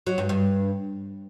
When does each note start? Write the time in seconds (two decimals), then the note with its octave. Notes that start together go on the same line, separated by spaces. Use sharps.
0.07 F#3
0.18 G2
0.29 G2